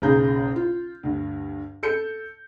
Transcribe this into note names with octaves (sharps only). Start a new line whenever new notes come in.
F#1 B1 C#3 G#4 A#5 G6
F4
D2 G2
A4 G6 C#7